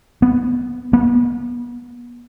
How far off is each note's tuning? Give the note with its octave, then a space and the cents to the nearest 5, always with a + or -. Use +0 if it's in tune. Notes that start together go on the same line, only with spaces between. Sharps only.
B3 +0
B3 -35